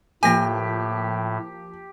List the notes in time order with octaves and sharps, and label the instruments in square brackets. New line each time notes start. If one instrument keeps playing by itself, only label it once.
[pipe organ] A2 [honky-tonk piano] F3 A#3 [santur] G4 [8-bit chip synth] G#5 A#6